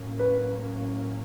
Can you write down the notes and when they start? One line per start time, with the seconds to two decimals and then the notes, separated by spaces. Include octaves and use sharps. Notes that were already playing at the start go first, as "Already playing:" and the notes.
Already playing: A2 F#3 A#3 C#4
0.19 B4